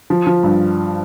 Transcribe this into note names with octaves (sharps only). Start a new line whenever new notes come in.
F3
F3
G2